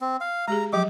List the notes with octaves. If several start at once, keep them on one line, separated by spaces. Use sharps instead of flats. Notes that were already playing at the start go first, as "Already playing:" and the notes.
C4
F5
G#3 G4 G#4 A#5
F3 F#3 G4 D6